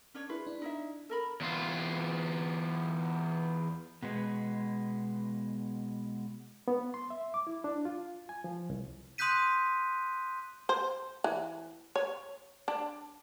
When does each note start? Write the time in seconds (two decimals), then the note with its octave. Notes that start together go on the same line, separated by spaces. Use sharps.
0.14 C#4 D4 C#5
0.30 E4 G#4 B4 C6
0.47 D4
0.62 D#4 E4 E5
1.09 A4 A#4 B5
1.41 E2 F4
4.03 B2 G#3 B3
6.68 B3
6.94 C6
7.10 E5
7.34 D6
7.47 E4
7.64 D4
7.85 F4
8.29 G#5
8.44 F3
8.70 C2
9.18 C6 D#6 F#6 G6 B6 D#7
10.69 C5
11.24 E3
11.96 C#5
12.68 D4